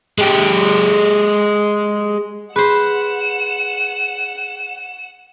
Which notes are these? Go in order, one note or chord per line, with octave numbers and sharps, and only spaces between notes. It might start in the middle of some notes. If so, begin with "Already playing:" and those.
G#3 G4
G#4 B4 C5 F#5 E7